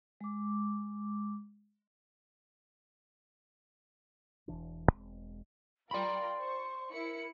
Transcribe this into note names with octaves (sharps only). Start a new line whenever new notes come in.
G#3 D6
E1 D#2 E3 D4
E1 F2 G#3 C4
F4 A#4 D5 G5 B5 C6
C5 C#6
E4 A#4 C#7